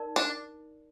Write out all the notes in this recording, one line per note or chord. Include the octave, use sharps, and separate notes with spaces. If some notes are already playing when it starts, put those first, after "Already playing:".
Already playing: D#4 A#4 D5
D4